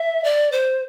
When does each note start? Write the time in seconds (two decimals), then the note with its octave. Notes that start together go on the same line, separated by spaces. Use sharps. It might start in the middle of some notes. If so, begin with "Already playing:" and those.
Already playing: E5
0.24 D5
0.52 C5